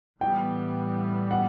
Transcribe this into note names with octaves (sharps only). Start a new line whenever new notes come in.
A2 E3 G3 B3 G5
F#5